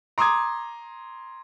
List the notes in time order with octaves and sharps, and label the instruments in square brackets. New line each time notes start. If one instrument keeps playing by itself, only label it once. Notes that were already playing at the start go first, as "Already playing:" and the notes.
[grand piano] A#5 C6 D6 D#6 G#6